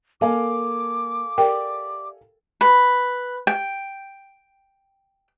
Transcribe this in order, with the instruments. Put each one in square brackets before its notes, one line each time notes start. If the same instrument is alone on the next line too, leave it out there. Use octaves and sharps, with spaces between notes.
[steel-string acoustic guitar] A#3 [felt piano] A4 F5 G#5 [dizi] D6
[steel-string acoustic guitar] G4 D5 E5 [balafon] A#4 G5
[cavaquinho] B4
G5